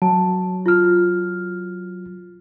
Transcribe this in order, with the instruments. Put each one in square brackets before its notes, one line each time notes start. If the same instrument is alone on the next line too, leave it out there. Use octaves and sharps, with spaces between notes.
[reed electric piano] F#3 [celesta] A5
[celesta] F4 F6